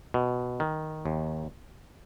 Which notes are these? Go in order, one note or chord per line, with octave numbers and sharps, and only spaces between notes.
B2
D#3
D#2